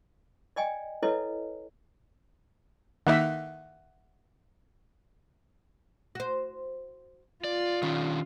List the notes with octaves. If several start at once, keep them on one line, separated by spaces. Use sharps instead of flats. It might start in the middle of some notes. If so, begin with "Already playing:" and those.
D5 D#5 G5 G#5
E4 A4 B4 C#5 D#5
D#3 A#3 D#4 E5 F#5
F#4 C5
F4 D5
D#3 C#4 D4